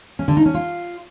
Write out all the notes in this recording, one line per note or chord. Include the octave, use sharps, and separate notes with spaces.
C#4
D3
D#4
C#4
F4